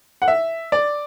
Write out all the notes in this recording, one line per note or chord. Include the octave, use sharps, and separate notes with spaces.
F#5
E5
D5